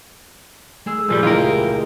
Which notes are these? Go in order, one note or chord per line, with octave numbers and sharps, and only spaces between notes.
G#3 A3 G#4 E6
G2 A#2 F3 G3
E1 C#2 E4 F4 G4 A#4